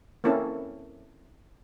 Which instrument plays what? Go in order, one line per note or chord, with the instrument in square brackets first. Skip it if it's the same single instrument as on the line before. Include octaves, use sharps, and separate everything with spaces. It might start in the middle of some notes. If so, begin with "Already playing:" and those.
[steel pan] A#3 C4 C#4 E4 A4